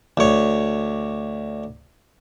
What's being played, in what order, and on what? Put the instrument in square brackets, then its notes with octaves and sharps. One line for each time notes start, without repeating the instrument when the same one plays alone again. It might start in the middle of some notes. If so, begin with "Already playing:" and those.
[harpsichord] D2 C#5